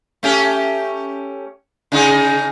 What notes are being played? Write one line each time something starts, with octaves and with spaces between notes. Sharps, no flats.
A3 C#4 G4
C#3 D#4 G#4